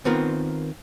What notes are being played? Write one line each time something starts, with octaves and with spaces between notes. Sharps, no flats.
D#3 B3 C4 F4 A#4